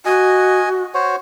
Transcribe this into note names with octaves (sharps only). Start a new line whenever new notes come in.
F#4 D#5 G#5
F#4 C5 C#5